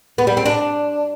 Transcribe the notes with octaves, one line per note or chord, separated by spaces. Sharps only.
B3
G3
C4
D4